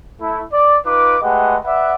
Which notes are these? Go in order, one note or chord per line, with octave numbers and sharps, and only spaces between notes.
A3 E4
D5
D#4 F4 B4 D6
G#3 A3 G4 B4 D#5 F#5
B4 D5 E5 F#5